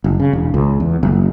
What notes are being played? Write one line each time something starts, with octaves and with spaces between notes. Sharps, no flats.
F#1
C#3
E1
C#2
E2
F#1